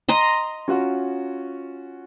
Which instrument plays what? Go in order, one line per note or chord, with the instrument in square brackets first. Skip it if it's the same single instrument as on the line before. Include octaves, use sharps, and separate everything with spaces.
[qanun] D#5 A#5 C6
[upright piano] C#4 F4 F#4